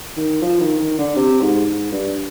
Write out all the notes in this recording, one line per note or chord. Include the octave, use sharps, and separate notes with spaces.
D#3
F3
D#3
D#3
D3
C3
G#2
G#2
G2